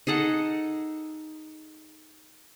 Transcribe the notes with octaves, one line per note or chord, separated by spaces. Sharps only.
D#4 G#4 A4 F#5